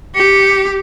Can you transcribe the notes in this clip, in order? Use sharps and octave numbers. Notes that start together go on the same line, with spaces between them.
G4 C#7